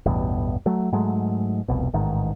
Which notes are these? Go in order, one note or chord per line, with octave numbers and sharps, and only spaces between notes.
A1 E2 G2 B2
F#3 A3
G#2 F#3 G#3 A3
F1 C2 B2
A1 G#2 D#3